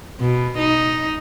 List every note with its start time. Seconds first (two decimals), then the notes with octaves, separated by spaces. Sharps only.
0.21 B2
0.59 D#4